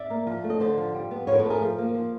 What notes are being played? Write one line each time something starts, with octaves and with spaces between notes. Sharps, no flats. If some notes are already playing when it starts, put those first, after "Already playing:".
Already playing: D5 E5
A#3
F3
A3
D#5
D3 C5 D5
F3
G3
B3
F3 B4 C#5
A#4
A4 B4
A3
G#4 A#4
F3
A#3
F3